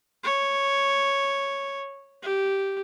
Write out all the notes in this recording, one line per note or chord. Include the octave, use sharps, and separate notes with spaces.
C#5
G4